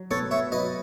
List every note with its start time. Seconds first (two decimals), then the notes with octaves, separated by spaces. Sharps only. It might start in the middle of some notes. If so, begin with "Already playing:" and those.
Already playing: F#3
0.10 B3 A4 C#5
0.31 C#5 E5
0.52 F#3 B4 D#5